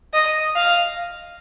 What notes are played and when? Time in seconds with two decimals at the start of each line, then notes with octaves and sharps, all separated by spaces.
0.14 D#5
0.56 F5